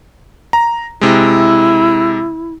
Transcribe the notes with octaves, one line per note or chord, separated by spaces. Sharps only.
A#5
C3 G#3 E4